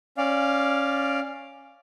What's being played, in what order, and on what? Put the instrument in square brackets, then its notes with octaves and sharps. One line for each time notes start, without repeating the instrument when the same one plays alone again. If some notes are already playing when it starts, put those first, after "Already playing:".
[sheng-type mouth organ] C#4 D5 F5